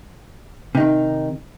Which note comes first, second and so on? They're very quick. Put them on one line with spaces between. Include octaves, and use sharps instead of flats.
C3 D#4 D#3